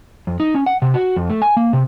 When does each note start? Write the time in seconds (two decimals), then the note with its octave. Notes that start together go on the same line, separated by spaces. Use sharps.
0.27 F2
0.40 D#4
0.55 C#4
0.66 F#5
0.82 C3
0.94 F#4
1.16 F2
1.30 A3
1.42 G#5
1.57 A#3
1.73 C3